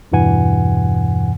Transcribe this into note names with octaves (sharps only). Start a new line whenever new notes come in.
E2 G2 B2 E3 F#5 G#5